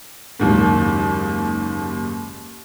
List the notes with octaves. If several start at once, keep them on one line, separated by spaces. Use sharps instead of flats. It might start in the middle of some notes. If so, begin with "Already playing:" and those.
F#1 D#2 G#2